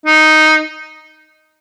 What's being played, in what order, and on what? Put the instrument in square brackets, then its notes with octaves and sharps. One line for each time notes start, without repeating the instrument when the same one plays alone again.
[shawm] D#4